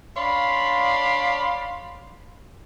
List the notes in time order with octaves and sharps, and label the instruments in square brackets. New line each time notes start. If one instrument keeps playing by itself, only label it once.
[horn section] D4 C#5 D5 F5 B5 C6